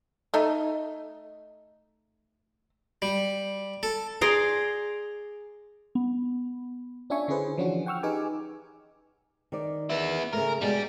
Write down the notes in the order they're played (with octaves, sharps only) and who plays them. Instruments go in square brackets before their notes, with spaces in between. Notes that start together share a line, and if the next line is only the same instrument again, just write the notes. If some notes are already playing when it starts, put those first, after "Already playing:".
[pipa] A3 D#4 D#5
[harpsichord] G3
A4
[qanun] G#4 D5 A#5 C6
[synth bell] B3
[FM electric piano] C#4 D4 F4 E5 G#5 C#6
D3 C#4 E4 G#4 B4 C5
E3 F3 C#4 D4 F#4
F#5 G5 C#6 E6 F6
D#4 G4 G#4 B4 G#5 D6
[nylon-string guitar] D#3 D5
[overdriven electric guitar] B3 E4
[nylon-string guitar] C#3 A3 [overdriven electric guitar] A#4
[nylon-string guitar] B2 G#3 [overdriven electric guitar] G3 D5